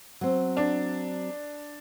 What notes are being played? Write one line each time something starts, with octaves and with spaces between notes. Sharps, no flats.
F#3 C4
D4